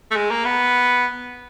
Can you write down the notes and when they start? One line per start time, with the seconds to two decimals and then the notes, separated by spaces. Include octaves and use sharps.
0.11 A3
0.16 G#3
0.31 A#3
0.45 B3